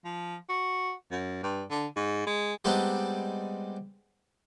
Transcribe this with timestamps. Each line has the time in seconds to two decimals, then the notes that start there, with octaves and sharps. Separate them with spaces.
0.05 F3
0.49 F#4
1.11 F#2
1.43 G2
1.71 D3
1.96 G#2
2.27 G#3
2.65 G3 G#3 B3 C4 D4 D#4